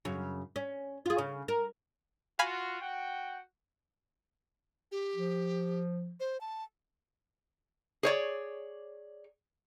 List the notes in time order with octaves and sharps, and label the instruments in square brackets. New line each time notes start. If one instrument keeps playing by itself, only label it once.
[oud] F#2 C#3
C#4
F4 G#4
C#3
A#4
[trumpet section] F4 F#4 [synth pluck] F5 G#5 B5
[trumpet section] F#4 F#5 G5
[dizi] G4
[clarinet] F3
[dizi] C5
A5
[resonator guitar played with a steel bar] G#4 C#5 D5